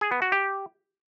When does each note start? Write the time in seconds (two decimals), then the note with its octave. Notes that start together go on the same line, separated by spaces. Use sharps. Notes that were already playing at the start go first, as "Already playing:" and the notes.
0.01 G#4
0.12 B3
0.22 F#4
0.32 G4